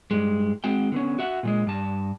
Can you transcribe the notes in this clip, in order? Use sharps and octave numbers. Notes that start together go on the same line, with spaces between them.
G2 G#3
G#3 C4 F#4 G5
D3 B3 C#4
F#4 E5 F#5
A#2 G3 G#3
G2 A5